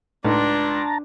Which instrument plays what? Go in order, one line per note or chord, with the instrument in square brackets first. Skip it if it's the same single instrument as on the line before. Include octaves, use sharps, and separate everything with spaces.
[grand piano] C#2 [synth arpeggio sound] A2 A3 D#4 [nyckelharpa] D4 [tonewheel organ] A5 A#5